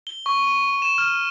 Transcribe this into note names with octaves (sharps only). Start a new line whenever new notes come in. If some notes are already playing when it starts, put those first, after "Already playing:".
G7
C#6
D#7
E7
F6